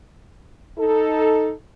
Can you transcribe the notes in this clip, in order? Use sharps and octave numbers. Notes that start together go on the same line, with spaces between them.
D#4 A4